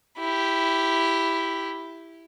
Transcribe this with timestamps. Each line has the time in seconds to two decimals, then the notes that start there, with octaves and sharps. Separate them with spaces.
0.18 E4 G4